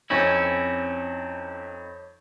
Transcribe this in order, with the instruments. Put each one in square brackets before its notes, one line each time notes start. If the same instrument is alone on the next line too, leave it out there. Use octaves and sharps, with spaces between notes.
[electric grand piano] F2 D#4 [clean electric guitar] C4 C#4 E4 [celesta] C#5 C#6 G6